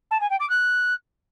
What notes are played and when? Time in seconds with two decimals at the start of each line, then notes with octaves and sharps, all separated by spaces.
0.11 A5
0.20 G#5
0.30 G5
0.40 D6
0.49 F#6